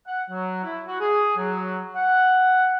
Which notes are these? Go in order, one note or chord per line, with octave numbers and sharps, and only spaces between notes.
F#5
F#3
E4
F#4
G#4
F#3
F#5